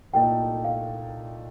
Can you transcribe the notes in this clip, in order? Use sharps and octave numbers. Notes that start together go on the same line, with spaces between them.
C2 A#2 A3 D#4 A4 G5
F5